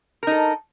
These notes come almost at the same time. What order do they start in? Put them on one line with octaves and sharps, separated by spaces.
A#4 D#4 A4